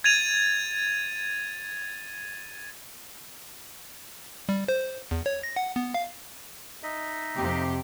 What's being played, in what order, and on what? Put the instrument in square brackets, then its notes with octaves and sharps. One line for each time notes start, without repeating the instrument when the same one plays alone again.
[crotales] G#6 A6 D#7 F7
[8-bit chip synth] G3
C5
E2
C#5
A#6
F#5
B3
F5
[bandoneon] D#4 D#5 E5
[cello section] F2 C3 G4